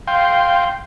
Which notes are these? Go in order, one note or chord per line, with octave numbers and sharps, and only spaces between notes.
F5 G5 C6